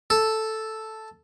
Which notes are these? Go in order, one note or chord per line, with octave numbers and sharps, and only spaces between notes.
A4